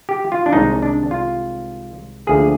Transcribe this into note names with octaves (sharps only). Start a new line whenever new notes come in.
G4
F4
D4
C2 C3 D#3 G#3 D#4
D4
F4
D2 D3 F3 A#3 G#4